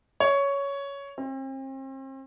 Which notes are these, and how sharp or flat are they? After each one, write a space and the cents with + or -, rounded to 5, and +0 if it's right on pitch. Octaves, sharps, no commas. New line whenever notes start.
C#5 +10
C4 +40